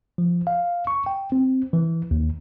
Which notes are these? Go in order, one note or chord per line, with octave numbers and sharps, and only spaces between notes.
F3
F5
C#6
G5
C4
E3
D#2